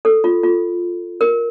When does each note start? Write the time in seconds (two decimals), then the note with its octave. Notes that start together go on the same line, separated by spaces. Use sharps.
0.05 A4
0.24 F4
0.43 F4
1.21 A#4